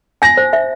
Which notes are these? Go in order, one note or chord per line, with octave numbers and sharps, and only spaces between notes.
G#5 A#6
C5
E5